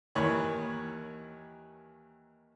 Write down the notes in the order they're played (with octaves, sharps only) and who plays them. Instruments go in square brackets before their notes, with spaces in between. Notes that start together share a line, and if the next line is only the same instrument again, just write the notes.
[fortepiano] D#2 D#3 E3 C#5 B5